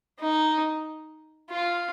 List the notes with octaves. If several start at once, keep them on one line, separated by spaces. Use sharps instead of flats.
D#4
F4